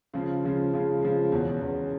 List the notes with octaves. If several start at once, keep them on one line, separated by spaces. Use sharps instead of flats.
C#3 F3 G#3
C#3 F3 G#3
C#3 F3 G#3
C#3 F3 G#3
E2 B2 G#3 C#4
E2 B2 G#3 C#4